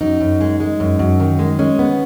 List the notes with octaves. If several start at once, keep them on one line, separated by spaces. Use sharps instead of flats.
F#2 D#4
F#2
G#3
G#3
F#2
F#2
D#3
G#3
G#3 C#4
B3